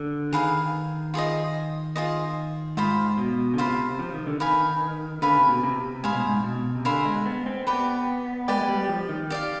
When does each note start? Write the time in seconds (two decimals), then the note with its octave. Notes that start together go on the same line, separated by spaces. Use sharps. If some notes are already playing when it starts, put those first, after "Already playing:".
Already playing: D3
0.33 D#3 G#4 B4 F5 G#5
1.14 F4 G#4 C5 D#5
1.95 F4 G#4 C5 D#5
2.77 G#2 F4 C5 F5 B5
3.18 B2
3.54 D3
3.58 C3 F4 C5 F5 B5
3.99 F3
4.13 D#3
4.27 D3
4.40 D#3 B4 F5 G#5 B5
5.22 D3 B4 F5 G#5 B5
5.36 C3
5.49 B2
5.63 C3
6.03 G#2 C5 F5 G#5 B5
6.14 B2
6.26 G#2
6.44 B2
6.75 C3
6.85 D3 C5 F5 G#5 B5
7.05 G#3
7.26 B3
7.46 C4
7.67 B3 G4 B4 D5 G5
8.48 G#3 G4 B4 D5 G5
8.61 G#3
8.69 G3
8.84 G3
8.89 F3
9.09 D#3
9.30 G4 D5 F5